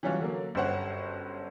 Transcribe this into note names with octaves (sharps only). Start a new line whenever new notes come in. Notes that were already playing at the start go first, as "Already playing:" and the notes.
E3 F#3 G3 C#4 F4 F#4
D3 F#3 A#3
G1 F#2 G4 C5 C#5 F#5